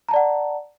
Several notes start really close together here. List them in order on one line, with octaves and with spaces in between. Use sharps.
A#5 A5 D5 F#5